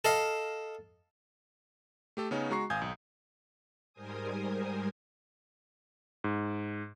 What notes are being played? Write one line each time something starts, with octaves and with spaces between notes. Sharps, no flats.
A4 D#5 F5
A3 G4 A4
C#3 B3 C#4 D#4
G#3 F#4 A#5 C#6 C7
G#1 F5 G#5 D#6 G6 G#6
B1
G#2 G3 A#4 C5 G#5 D#6
G#2